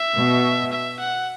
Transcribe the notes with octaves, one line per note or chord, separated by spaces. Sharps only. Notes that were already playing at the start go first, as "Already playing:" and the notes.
Already playing: E5
B2
E5
F#5